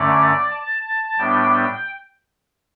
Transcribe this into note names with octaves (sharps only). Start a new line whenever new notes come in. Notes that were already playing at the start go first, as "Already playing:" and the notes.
Already playing: F#2 D3 A3 C#4 D5
A5
A2 G3 B3 D4 G5